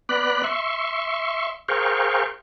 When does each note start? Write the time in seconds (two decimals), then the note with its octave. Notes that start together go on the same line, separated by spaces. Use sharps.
0.09 B3 D5 B5 F#6
0.44 E5 C6 C#6
1.68 G#4 A#4 C5 F5 G5 C#6